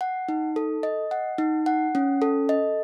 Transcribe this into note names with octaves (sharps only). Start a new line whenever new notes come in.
F#5
D#4
A4
D#5
F#5
D#4
F#5
C#4
A4
D#5